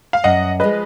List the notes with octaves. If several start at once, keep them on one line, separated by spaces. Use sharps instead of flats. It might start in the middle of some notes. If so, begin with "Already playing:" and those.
F5
F#2 D#5 F#5
F3 G#3 B4 D#5